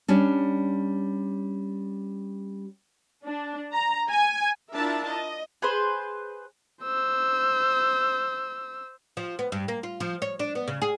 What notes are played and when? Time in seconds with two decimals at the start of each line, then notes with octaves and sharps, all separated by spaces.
0.08 G3 C#4 D4
3.24 D4
3.73 A#5
4.09 G#5
4.73 D4 E4 F4 A#4 E5 A5
5.08 D#5
5.62 G#4 B4 C5
6.83 C5 E6
9.17 F3
9.39 B3
9.52 G2
9.68 A#3
9.83 F4
10.00 F3
10.22 C#5
10.39 D4
10.55 B3
10.68 C#3
10.82 G#4